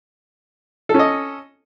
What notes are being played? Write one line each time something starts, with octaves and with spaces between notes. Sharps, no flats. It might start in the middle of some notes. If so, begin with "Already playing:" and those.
C#4 A4 D#5